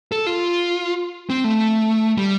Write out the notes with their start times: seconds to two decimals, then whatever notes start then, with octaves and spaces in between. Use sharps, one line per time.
0.12 A4
0.27 F4
1.30 C4
1.44 A3
2.18 G3